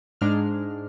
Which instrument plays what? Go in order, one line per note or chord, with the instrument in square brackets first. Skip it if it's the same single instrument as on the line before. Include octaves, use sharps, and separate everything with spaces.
[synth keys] G#2 G#3 D4 F6